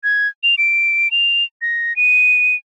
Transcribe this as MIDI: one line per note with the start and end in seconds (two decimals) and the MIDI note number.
0.04 0.28 92
0.43 0.55 101
0.58 1.11 98
1.11 1.44 101
1.62 1.96 94
1.96 2.56 99